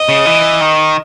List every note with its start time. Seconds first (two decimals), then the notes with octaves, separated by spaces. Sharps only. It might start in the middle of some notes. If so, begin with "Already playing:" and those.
Already playing: D#5
0.09 C#3
0.26 E3
0.61 D#3